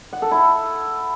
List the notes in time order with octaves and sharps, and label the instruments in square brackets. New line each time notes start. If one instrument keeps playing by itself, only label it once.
[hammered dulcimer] F#5
A4
E4